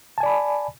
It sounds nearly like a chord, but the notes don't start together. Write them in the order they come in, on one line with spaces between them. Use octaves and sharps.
A5 G#5 D5 B5